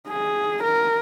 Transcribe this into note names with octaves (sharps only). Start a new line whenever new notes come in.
G#4
A#4